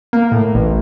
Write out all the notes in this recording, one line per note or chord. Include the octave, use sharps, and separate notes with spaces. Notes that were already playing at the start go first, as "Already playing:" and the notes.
A#3
A2
A1